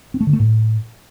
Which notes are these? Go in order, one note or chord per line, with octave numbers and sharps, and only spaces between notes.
C4
A3
D3
A3
A2